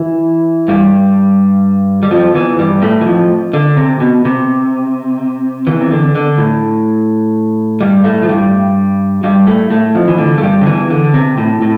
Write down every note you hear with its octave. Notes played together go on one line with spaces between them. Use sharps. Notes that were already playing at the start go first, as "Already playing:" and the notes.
Already playing: E3 E4
G2 G3
G3
F2 F3
E2 E3
G2 G3
A2 A3
E3
F2 F3
D3
C3
B2
C3
E2 E3
C3
D3
D3
A2
G2 G3
A2 A3
F3
G2 G3
G2 G3
A2 A3
A2 A3
F2 F3
E3
D3
A3
G2 G3
D3
E2 E3
D3
C3
A2
A2